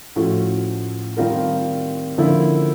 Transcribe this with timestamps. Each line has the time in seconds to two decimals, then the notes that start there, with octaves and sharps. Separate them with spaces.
0.16 A2 F3 A3 C#4 F#4
1.17 D#3 G3 C4 F4 A#4
2.18 D3 F3 A#3 C#4 E4